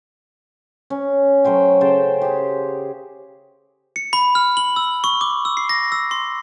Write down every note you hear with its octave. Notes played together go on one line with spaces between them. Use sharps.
C#4
F#3 A3 C5 G5
C#3 C5 G5 A5
G4 G#4
C#7
B5
F6
F#7
E6
C#6
D6
E6
C7
A#6
E6
C6